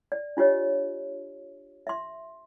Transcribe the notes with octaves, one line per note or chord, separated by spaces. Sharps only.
D5
D4 F4 G4 C#5 D#5
E5 C6